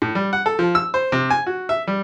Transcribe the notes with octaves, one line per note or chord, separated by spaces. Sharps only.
A2
G3
F#5
A4
F3
E6
C5
C3
G#5
F#4
E5
G3